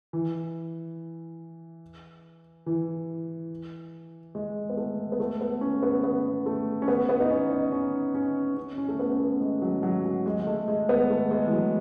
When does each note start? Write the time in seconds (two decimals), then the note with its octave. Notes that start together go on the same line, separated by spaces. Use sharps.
0.13 E3
2.66 E3
4.35 G#3
4.70 B3
4.77 A3
5.12 B3
5.20 A3
5.41 B3
5.61 C#4
5.83 B3
6.04 B3
6.46 A3
6.82 C#4
6.88 B3
7.09 B3
7.20 D#4
7.31 C#4
7.51 D#4
7.72 C#4
8.15 C#4
8.57 C#4
8.78 C#4
8.88 A3
8.99 B3
9.12 C#4
9.20 B3
9.41 G#3
9.62 F#3
9.83 F#3
10.05 F#3
10.26 G#3
10.40 G#3
10.47 A3
10.68 G#3
10.89 B3
11.10 A3
11.31 G#3
11.46 E3
11.52 F#3